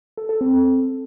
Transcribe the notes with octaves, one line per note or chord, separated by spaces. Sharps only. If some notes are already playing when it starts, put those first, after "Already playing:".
A4
A4
C4